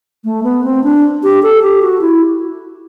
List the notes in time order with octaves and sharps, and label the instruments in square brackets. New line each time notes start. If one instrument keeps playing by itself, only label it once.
[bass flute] A3
B3
C4
D4
G4
A4
G4
F#4
E4